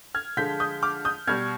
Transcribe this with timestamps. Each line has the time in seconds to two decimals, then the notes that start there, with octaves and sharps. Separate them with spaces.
0.15 F6 G#6
0.37 D3 F3 G#3 G6 B6
0.60 D#6 G6
0.83 D6 F6
1.05 D#6 G6
1.27 B2 G3 F6 G#6